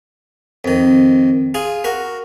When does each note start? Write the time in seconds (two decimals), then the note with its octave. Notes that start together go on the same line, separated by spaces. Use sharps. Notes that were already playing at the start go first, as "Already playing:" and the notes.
0.65 F2 D#3
1.54 F4 G#4
1.84 F#4 A#4